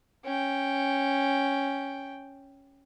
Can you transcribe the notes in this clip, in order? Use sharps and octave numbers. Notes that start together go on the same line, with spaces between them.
C#4 G5